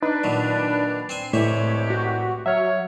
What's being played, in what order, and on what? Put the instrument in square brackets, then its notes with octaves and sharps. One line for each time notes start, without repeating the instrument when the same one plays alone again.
[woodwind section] D4 [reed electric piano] D#4 [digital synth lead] B4
[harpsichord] A#2 D#3 F#3
[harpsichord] C4 C5 G#5 [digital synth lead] C7
[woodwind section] C2 G#3 G4 [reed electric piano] A2 [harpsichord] E3 D5 E5 [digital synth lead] C#5
[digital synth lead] F#4
[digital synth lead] F#3 [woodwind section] C#5 [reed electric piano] E5 F6